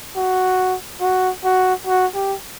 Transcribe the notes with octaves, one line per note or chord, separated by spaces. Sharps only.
F#4
F#4
F#4
F#4
G4